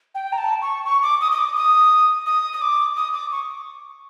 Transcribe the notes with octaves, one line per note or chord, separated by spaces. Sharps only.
G5
A#5
A5
C#6
C#6
D6
D#6
D#6
D6
D#6
D#6
D#6
D6
D#6
D6
C#6